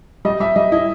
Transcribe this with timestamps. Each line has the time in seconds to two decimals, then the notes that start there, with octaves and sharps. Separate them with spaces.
0.25 G3 D#5
0.40 G3 E5
0.56 G3 D#5
0.72 E4 D#5